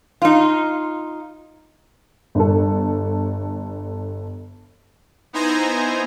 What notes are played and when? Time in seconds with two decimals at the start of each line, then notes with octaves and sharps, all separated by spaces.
0.22 D#4 F4
2.35 G1 A4
5.33 B3 D#4 E4 C5 G#5 A#5